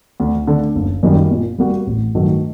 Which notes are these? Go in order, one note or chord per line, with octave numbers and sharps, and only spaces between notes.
D2
D3 A3
F#1
F#2 D#3 G3 A#3
A#2
G3 A#3 F#4
A1
G2 D#3 F#3 A3